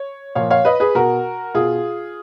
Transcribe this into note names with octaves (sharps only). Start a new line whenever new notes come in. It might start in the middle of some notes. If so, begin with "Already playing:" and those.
Already playing: C#5
A#2 F3 C#5 F5
C#5 F5
B4 D#5
G#4 B4
B2 F#4 A#4
B2 F4 G#4